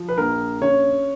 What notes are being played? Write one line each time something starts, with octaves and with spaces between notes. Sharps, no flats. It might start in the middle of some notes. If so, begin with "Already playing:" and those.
Already playing: F3
B4
A#1 A#4
C#3 C#5